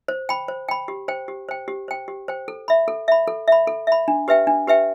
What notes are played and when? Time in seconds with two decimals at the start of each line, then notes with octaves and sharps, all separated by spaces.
0.08 C5
0.29 G5 B5
0.48 C5
0.69 G5 B5
0.88 G4
1.08 C5 G5
1.28 G4
1.49 C5 G5
1.68 G4
1.88 C5 G5
2.08 G4
2.28 C5 G5
2.48 A4
2.68 E5 B5
2.88 A4
3.08 E5 B5
3.27 A4
3.48 E5 B5
3.67 A4
3.87 E5 B5
4.08 D4
4.28 G4 B4 E5 G5
4.47 D4
4.68 G4 B4 E5 G5